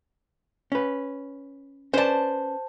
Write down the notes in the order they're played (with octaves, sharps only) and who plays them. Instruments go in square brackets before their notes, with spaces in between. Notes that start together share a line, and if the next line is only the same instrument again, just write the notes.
[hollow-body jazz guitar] C#4 B4
[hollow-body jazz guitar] C#4 B4 D5 [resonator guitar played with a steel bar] C5 A5